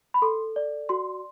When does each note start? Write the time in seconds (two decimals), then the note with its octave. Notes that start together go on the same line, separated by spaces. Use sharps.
0.14 B5
0.22 A4 C6
0.56 D5
0.89 F#4 C6